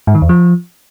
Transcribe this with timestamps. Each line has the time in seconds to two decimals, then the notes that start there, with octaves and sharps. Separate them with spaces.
0.07 G#2
0.15 D#3
0.22 E2
0.29 F3